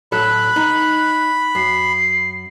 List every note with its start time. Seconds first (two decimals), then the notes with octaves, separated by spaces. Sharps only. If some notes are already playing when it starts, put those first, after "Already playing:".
0.12 A2 F#3 A4 B5 F#6
0.56 D#4
1.55 F#2 C7